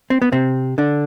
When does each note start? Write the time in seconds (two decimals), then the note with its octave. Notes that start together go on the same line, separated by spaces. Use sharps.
0.10 C4
0.22 B3
0.32 C3 C4
0.78 D3 D4